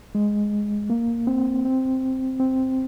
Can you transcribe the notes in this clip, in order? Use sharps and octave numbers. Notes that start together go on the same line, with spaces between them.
G#3
A#3
C4
C4
C4